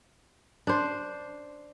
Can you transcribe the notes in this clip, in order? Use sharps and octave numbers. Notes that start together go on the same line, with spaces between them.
D4 C5